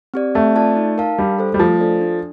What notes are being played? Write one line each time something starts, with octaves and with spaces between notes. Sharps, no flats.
C4 G4 D5
A3 C4
F4 A4 D5 A5
D#4
A#4 F5 A5
G3 D4
A4 C5
G3
F3 A3
D4 A4 D5
D4